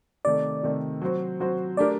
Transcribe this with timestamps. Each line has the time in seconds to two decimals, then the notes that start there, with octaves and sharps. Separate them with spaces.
0.25 C3 D#3 A3 D5
0.63 C3 D#3 A3
1.02 F#3 C4 F#4 C5
1.40 F#3 C4 F#4 C5
1.77 A3 D4 G4 A#4 D5